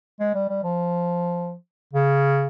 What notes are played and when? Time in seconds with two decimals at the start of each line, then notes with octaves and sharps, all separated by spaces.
0.20 G#3
0.34 G3
0.49 G3
0.63 F3
1.93 C#3